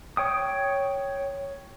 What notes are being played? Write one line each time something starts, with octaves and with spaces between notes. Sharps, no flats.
C#5 G5 D#6